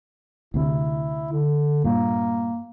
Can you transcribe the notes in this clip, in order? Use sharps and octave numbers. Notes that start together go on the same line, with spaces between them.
D2 C3 E4
D3
G2 A#2 A#3